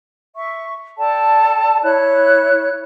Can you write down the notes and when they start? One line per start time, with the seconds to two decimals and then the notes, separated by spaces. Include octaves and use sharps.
0.35 E5 C#6
0.98 A4 D5 G5 A5
1.83 E4 C#5 F#6